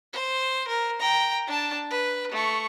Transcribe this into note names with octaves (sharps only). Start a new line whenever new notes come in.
C5
A#4
G5 A#5
D4 A5
B4
A3 C#6